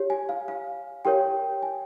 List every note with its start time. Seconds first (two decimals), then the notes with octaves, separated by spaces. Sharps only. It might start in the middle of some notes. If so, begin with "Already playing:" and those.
Already playing: G4 C#5
0.10 G#5
0.29 F5
0.48 F5
1.05 G4 A#4 C#5 G5
1.62 G#5